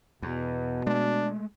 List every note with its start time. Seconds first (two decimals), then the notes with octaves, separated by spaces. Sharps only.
0.22 E2 B2
0.87 G#3 A3 D4